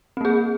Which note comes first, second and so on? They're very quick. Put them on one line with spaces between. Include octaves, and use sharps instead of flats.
C4 A#3 G#4